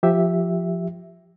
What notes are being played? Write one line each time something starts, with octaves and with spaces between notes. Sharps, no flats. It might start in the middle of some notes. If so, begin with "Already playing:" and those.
F3 G4 E5